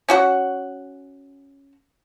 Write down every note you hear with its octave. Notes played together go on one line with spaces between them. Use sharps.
C#4 F#4 F#5